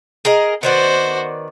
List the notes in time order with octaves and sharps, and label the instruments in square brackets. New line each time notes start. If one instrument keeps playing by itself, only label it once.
[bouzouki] G#4 A#4 D#5
[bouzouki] D#3 B3 D5 [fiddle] F#4 C5